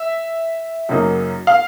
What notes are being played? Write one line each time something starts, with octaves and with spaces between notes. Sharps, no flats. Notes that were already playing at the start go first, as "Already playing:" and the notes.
Already playing: E5
F#2 C#3 F#3 A#3 D#4
F5